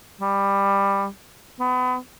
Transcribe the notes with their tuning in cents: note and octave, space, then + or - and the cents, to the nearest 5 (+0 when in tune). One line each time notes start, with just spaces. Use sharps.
G3 +15
B3 +35